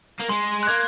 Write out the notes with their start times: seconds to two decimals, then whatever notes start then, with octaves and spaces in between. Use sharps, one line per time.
0.19 A#3
0.29 G#3 C6
0.63 F#6
0.67 A#3 G#6